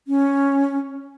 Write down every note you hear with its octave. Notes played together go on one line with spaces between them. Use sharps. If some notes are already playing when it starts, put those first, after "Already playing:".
C#4